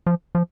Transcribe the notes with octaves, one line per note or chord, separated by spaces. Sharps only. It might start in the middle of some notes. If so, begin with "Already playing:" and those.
F3
F3